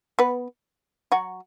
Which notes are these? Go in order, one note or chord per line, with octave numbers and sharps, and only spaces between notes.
B3 B4
F#3 F#4